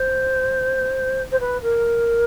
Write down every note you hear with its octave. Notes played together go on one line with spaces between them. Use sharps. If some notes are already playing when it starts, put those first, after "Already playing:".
Already playing: C5
C5
B4
A#4